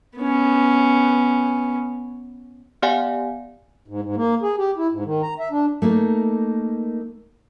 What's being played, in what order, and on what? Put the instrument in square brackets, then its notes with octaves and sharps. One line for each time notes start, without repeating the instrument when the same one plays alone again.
[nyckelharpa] B3 C#4
[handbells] B3 G4 D5 F5 F#5 G#5
[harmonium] G#2
G#2
A#3
G#4
G4
E4
G#2
D#3
A#5
E5
D4
[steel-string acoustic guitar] A3 A#3 D#4 A#4